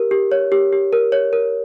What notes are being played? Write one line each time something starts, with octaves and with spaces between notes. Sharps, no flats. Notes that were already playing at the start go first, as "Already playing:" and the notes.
Already playing: G4 A#4
G4
C#5
G4
G4
A#4
C#5
A#4